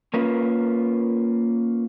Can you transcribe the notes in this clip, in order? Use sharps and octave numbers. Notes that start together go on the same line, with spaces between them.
A#3 C#4 F4 A#4 B4